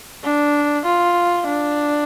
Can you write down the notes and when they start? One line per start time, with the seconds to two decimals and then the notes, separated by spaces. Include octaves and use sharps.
0.24 D4
0.85 F4
1.47 D4